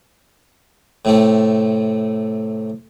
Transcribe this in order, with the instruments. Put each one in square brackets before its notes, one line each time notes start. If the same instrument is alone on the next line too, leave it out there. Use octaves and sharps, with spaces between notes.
[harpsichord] A2 C3 A3